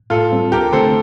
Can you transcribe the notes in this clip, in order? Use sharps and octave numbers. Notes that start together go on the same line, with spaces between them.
A2 F4 A4
G3 C4
D2 G4 A#4
D3 A3 C4 A4 C5